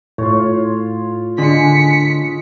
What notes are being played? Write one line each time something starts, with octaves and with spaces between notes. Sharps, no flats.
A2 F4 C#5
D3 G#3 B6 C#7